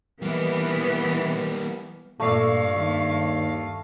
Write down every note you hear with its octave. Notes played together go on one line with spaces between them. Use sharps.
E3 G3 A#3 B3
G2 A#2 A3 D5 F5 E6
D#2 E5